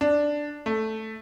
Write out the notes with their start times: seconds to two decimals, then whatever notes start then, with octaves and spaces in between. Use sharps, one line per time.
0.01 D4
0.66 A3